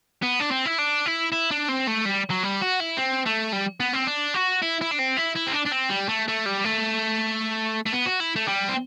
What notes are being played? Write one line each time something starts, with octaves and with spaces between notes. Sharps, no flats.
B3
D4
C4
E4
D4
E4
E4
D4
C4
A3
G3
F#3
G3
F#4
E4
C4
A3
G3
B3
C4
D4
F#4
E4
E4
D4
C4
E4
E4
C4
D4
D4
C4
G3
A3
A3
G3
A3
A3
B3
F#4
E4
A3
G3
C4